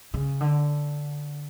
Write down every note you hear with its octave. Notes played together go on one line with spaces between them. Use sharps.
C#3
D3